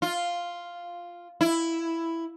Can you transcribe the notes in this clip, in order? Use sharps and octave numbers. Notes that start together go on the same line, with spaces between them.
F4
E4